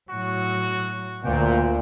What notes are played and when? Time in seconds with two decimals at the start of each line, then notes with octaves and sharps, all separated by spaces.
0.10 A2 F#3 F#4
1.24 D2 A#2 G5